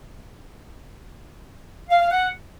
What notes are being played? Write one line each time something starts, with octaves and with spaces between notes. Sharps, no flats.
F5
F5
F#5